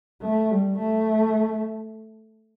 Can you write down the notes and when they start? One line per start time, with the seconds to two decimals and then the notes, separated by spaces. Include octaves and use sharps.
0.22 A3
0.51 G3
0.79 A3